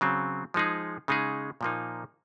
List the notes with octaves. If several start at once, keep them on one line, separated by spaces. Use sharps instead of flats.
C#3 F#3 C4
F3 G#3 D#4 G#4
C#3 G#3 D#4 G#4
A#2 F3 A#3 D#4